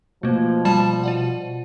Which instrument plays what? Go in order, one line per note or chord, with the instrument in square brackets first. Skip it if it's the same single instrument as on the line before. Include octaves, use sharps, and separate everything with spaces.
[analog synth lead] B2 [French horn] F3 [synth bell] A3 A#3
[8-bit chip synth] G3 A5 [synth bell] D5
[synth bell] F4 D5 F#5